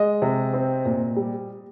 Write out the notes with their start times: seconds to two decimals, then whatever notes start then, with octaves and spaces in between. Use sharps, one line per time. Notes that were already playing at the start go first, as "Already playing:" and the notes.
Already playing: G#3 D#5
0.22 C3
0.53 C4
0.85 A#2
1.16 G3